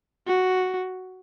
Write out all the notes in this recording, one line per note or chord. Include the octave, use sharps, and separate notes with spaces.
F#4